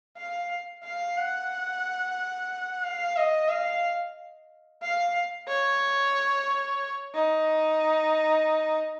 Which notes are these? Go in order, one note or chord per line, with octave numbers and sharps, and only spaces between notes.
F5
F5
F#5
F5
D#5
F5
F5
C#5
D#4